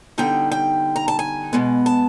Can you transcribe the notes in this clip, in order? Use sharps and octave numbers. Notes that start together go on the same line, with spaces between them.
D3 G3 B3 D#4 G5
G5
A#5
A5
G#5
B2 G#3 B3
A5